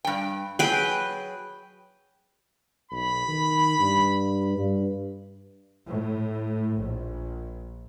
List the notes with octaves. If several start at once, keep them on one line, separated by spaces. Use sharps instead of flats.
G2 G5
F#3 G#4 B4 G5
B1 B5
D#3
G2
G2
A2
A#1